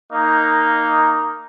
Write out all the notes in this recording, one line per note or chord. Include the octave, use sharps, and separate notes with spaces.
A#3 D#4